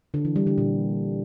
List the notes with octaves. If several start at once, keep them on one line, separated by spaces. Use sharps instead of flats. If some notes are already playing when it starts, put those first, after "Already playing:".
D3
E3
G3
D3
A#2